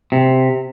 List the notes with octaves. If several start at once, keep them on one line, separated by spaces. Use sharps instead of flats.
C3